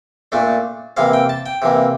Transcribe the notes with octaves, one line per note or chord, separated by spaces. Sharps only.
A#2 A3 D4
C3 E3 A#3 F5
G5
A5
G5
C3 E3 A#3